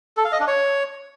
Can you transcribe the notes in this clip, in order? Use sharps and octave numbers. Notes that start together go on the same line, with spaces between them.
A4
F5
D#5
D4
C#5